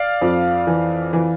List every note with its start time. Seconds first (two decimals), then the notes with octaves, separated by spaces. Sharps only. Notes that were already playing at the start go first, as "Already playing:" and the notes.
Already playing: D5 F5
0.22 F2
0.67 E3
1.13 E3